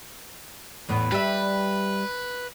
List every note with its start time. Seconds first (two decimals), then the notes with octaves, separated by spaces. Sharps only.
0.89 E2 A2 B3
1.12 G3 B4 E5